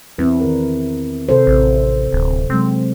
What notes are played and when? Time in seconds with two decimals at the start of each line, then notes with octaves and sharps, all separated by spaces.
0.18 E2 C4 E4 B4
0.40 D#3 A#4
1.29 C3 A4 C5
1.47 A1
2.12 D1
2.50 C3 F#3 G#3 C4